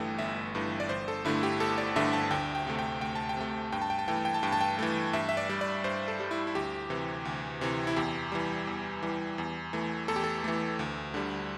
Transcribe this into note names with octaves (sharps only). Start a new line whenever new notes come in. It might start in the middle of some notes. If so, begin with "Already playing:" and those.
Already playing: G1 G2 E3 A3 G5
G1 E5
G2 E3 A3
D5
G1 C5
A4
G2 D3 A3 E4
G4
G1 A4
D5
G2 D3 A3 E5
A5
D2 G5
G5
C3 A3
G5
D2 G5
A5
G5
C3 A3
G2 G5
A5
G5
A5
E3 A3 G5
A5
G5
A5
G2 G5
A5
G5
E3 A3
G2 E5
E5
D5
G3
D5
G2 C5
A4
G3
E4
E4
D2 G4
C3 E3
D2
C3 E3
E4
E2 G4
E3 G3
E2
E3 G3
E2
E3 A3
E2 A4
G4
A4
E3 A3
D2
D3 G3